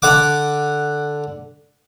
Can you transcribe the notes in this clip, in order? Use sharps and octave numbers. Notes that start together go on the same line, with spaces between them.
D3 F#5 D6